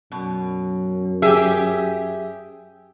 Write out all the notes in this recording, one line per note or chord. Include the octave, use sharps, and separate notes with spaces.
F#2 B2
G4 G#4 E5